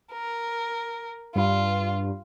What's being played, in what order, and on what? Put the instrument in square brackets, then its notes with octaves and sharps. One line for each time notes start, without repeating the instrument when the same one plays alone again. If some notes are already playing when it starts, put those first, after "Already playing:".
[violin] A#4
[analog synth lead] G2 [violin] F4